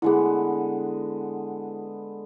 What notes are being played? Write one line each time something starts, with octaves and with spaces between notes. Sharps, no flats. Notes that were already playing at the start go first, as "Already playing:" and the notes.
D3 G#3 B3 E4 G#4